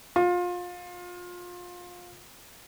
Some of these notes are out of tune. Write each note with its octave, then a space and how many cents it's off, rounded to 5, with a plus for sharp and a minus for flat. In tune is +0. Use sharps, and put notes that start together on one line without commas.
F4 +25